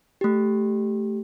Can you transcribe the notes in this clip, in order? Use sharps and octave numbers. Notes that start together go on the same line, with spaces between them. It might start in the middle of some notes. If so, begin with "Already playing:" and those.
A3 G4